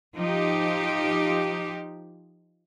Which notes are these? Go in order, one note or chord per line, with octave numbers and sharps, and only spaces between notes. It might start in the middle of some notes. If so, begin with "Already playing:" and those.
F3 D#4 G4